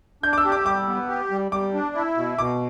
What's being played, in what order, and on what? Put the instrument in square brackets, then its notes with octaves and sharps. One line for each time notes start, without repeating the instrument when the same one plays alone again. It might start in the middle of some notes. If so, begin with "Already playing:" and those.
[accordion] D4 [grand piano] G6
[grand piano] D6
E6
[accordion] G4
[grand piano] D6
[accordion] G3 [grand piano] D6
[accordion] B3
G4
G3
[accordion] G3 [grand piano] D6
[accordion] D4
E4
B2
[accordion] B2 [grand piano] D6